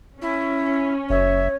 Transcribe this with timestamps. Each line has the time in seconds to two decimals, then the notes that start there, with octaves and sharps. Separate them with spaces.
0.21 C#4 E4
1.10 F#1 C#5 E5